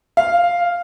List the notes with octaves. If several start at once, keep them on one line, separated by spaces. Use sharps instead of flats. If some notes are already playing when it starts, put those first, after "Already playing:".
F5